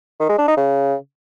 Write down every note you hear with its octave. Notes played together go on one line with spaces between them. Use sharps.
D#3
G#3
D4
D#4
C#3